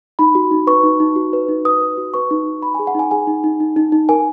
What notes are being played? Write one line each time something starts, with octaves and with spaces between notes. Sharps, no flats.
D#4 B5
F#4
D#4
B4 C#6
D#4
D#4
F#4
B4
D#4
B4 D#6
B4
F#4
B4 C#6
D#4
B4
D#4 B5
G#5
G#4
F#5
D#4 G#5
G#4 G#5
D#4
D#4
D#4
D#4
D#4
A#4 G#5